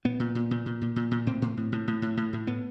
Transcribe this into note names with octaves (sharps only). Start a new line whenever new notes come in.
A#2 B3
A#2
A#2
A#2
A#2
A#2
A#2
A#2
A2 C4
A2
A2
A2
A2
A2
A2
A2
A2 B3